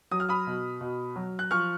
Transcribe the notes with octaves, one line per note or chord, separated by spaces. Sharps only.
F#3 D#6
F6
B5 D#6
B2
B2
F#3
F#6
F3 C#6 F6